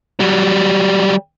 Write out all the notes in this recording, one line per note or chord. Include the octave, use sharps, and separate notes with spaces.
F#3 G3